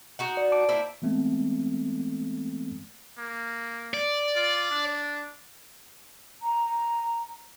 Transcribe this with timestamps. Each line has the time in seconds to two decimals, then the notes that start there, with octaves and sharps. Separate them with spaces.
0.19 D#4 F#4 F#5
0.37 D5
0.52 A5 D6 D7
0.69 A#3 E4 C5
1.02 E3 G#3 A3 B3 C4
3.18 A#3
3.94 D5
4.36 F4
4.71 D4
6.42 A#5